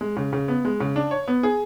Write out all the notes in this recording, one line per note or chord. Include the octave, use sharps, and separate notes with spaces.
G#3
C#3
C#3
B3
G#3
C#3
D4
C#5
B3
G#4